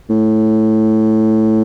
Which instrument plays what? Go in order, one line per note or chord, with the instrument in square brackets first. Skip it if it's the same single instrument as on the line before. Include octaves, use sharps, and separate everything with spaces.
[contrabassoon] A2